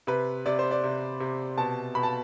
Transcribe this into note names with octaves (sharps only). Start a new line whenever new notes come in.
C3 B4
C3 D5
C5
D5
C3
C3
B2 A5
B2 B5
A5